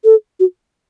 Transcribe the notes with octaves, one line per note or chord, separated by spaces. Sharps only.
A4
F#4